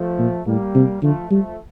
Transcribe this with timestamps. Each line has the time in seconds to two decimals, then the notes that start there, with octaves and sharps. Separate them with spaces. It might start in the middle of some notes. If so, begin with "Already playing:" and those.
Already playing: F3 A3
0.18 A#2
0.46 A2 G3 A#3
0.74 C3
1.02 D3 F3 A3
1.30 F3 G3 A3